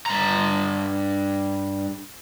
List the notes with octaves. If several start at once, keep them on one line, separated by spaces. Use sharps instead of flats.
G2 A#5